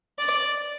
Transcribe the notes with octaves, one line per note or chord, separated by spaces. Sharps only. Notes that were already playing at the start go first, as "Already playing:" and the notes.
D5